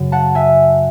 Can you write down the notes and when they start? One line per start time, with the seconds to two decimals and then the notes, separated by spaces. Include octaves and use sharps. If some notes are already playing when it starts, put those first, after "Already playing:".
Already playing: F#2 C#3
0.12 F#5 A5
0.35 E5 G#5